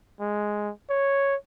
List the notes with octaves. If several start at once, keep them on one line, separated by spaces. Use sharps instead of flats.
G#3
C#5